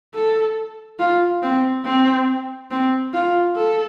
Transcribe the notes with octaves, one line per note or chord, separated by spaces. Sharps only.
A4
F4
C4
C4
C4
F4
A4